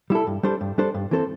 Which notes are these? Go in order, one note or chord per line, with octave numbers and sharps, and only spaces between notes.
G3 E4 A4
G2
G3 D4 A4 C5
G2
G3 D4 A4 C5
G2
E3 C4 A4 C5